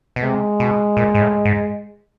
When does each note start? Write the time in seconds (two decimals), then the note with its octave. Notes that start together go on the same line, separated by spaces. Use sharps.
0.16 B2
0.23 C3 G#3
0.60 B2
0.97 A#2
1.15 G#2
1.21 A2
1.45 G#2